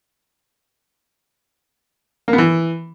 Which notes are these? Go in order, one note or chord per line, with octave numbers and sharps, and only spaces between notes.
A#3
B3
E3